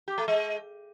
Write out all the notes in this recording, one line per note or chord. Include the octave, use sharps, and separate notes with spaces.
G4
A3
G#3